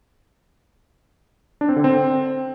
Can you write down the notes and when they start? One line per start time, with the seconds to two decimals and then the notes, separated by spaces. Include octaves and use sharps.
1.61 D4
1.69 C4
1.76 D3
1.84 C4